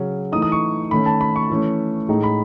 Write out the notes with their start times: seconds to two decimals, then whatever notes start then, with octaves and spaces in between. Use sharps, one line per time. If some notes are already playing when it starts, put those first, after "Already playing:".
Already playing: C#3 F#3 C#4
0.32 E3 A3 D#4 D#6
0.42 D#6
0.52 C#6
0.91 D#3 A3 C#4 B5
1.06 A5
1.21 B5
1.36 C#6
1.50 E3 A3 C#4
2.09 A2 G#3 D#4
2.23 B5